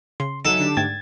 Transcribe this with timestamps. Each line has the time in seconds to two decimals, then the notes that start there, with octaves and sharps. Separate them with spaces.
0.20 C#3 C6
0.45 F#3 D#4 A4 E5 F#5 G#5
0.59 D3 D4 G4
0.77 G#2 A3 G5 G#6 A6